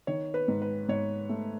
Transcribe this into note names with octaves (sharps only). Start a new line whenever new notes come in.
D#3 C#5
B4
G#2
B4
G#2 C#5
A3